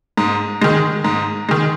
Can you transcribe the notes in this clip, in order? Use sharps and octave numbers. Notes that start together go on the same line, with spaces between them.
G#2
D#3 G#3
G#2
D#3 G#3